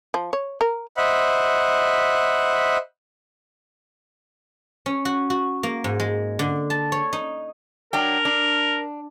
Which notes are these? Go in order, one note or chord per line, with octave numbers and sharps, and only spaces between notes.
F3
C#5
A#4
C5 D#5 E5 F#5 B5
C#4
F#4
F#4
A#3
G#2
G#3
D3
A5
C#5
D#4
F#3 D4 A#4 G5
D4